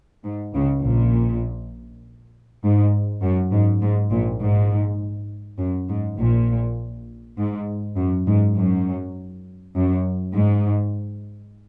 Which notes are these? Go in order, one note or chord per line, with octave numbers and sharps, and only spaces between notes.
G#2
C#2 C#3
A#1 A#2
G#2
F#2
G#2
G#2
A#1 A#2
G#2
F#2
G#2
A#1 A#2
G#2
F#2
G#2
F#2
F#2
G#2